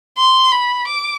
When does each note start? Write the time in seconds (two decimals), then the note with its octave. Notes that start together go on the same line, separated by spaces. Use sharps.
0.18 C6
0.52 B5
0.87 D6